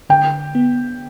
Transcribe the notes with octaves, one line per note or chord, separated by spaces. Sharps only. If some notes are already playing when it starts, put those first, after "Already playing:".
D3 G5
B3